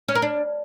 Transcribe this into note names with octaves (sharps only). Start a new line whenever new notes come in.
C#4
A#4
D4